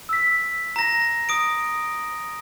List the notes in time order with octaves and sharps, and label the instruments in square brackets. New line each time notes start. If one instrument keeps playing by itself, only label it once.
[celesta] E6 B6
[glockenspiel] A#5 A#6
D#6 D7